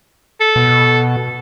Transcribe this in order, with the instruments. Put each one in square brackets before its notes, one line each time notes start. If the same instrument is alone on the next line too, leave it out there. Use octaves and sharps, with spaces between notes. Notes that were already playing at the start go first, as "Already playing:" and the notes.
[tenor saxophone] A4
[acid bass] B2